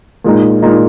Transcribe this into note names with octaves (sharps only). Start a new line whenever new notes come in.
A#2 G#3 D#4
A#2 G#3 D#4